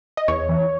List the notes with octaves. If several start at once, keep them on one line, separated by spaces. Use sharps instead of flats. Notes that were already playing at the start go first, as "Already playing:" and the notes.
D#5
E2 C#5
E3